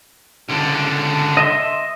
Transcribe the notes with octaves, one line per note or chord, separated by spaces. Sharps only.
C#2 D3
D#5 E5 C6